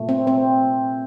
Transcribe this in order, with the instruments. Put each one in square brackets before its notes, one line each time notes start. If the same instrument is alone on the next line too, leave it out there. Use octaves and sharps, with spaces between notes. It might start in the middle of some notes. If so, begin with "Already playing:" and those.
Already playing: [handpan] A#2 A3
C4
C4